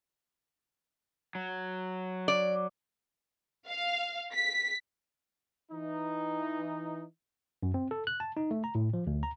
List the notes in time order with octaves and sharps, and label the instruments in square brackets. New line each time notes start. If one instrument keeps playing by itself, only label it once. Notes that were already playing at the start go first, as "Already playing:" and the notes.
[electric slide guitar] F#3
[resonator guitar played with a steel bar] D5
[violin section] F5
B6
[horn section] E3 D#4
[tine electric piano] F#2
C4
A4
F#6
A5
D#4
A3
A#5
A2
F3
D2
A#5